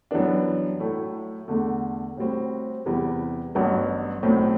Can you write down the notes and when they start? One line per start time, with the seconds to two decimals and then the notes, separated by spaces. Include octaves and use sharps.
0.11 F#2 E3 G3 B3 D4
0.80 A2 F#3 A3 E4
1.48 E2 D3 A3
2.17 A2 G3 C4 F#4
2.86 E2 C3 E3 G3
3.55 A1 G2 F#3 B3 F#4
4.23 B1 A2 F#3 A3 C4